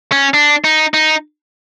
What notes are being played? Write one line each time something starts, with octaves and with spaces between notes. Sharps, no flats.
C#4
D4
D#4
D#4